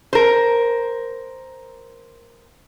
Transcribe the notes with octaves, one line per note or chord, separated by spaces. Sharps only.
A#4 C5